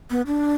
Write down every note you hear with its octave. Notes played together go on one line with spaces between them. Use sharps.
B3
D4